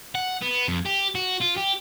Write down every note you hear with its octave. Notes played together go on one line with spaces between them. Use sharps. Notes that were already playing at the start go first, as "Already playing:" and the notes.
F#5
B3
F2
G4
F#4
F4
G4